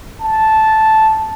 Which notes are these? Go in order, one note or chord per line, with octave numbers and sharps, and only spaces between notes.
A5